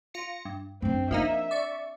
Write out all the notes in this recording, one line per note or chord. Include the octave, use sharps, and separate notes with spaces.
F4 A#6 C#7
G2
F#2 C4 D4
F3 A#3 D4 D#4 E5
D5 C#6